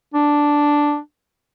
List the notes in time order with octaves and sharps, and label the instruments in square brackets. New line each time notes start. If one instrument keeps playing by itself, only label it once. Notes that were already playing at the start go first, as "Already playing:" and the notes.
[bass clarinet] D4